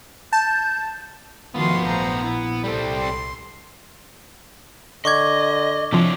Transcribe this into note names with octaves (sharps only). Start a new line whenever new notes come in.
A5 G6
D#3 F3 A3 B3 F4 F#4 C6
A#1 C5 A#5
B3 E4
C2 G3 C4 A4
C6
D3 D#5 C#6 D6 G#6
C3 F3 D4 E4 C#5